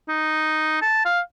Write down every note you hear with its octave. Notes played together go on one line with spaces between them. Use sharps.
D#4
A5
F5